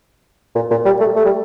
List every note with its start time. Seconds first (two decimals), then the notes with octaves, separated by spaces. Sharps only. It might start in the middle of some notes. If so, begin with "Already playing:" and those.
0.56 A#2
0.71 A#2
0.85 G3
1.00 A3
1.16 A3
1.25 G3